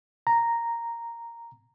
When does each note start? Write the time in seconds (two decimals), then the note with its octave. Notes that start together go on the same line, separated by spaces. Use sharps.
0.27 A#5